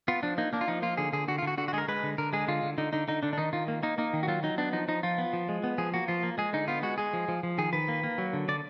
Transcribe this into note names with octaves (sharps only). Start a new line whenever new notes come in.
B3 F4
F3 D4
A#3 D#4
A#3 D4
F4
F3 D#4
A#3 F4
D3 G#4
D3 G#4
D3 F#4
F4
D3 F#4
D3 F#4
F#4
G#3 G#4 A#4
G#3 B4
D3
D3 A#4
G#3 G#4
D3 F4
D3
D3 D#4
D3 D#4
D3 D#4
D3 D4
D4
D#3 D#4
D#3 F4
A#3
A#3 D#4
A#3 D#4
D#3
F#4
F#3 F4
F#3 D#4
B3 D4
F3 D#4
F3 D#4
F3 F4
B3
F3
G#3
B3
F3 G#4
A#3 F#4
F3 F4
A#3
G#3 G#4
D3 D#4
B3 F4
G#3 F#4
G#3 G#4
F3
F3
F3
D#3 G#4
D#3 B4
A#3
A#3
F#3
D3
D3 D5